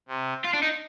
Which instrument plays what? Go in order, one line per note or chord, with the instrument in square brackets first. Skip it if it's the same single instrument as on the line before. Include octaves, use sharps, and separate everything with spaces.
[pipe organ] C3
[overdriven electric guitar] F4
D4
D#4